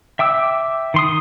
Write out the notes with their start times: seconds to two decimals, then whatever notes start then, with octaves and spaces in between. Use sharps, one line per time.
0.19 E5 G5 D6 E6
0.94 D#3 C6 D#6